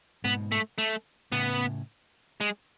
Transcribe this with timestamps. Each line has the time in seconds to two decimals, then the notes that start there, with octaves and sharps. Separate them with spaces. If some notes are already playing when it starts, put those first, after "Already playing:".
0.24 G#2 B2 B3
0.52 A3
0.78 A3
1.32 A2 C#3 B3
2.41 G#3